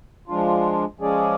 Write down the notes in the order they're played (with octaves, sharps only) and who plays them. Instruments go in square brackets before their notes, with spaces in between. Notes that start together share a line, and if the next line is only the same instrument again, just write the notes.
[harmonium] F3 G#3 D4 F4
F3 G#3 C#4 G#4 D5